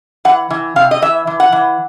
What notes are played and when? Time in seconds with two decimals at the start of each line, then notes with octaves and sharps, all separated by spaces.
0.25 E3 F#5
0.50 E3
0.76 C3 F5
0.91 D#5
1.02 E3 E5
1.27 E3
1.40 F#5
1.52 E3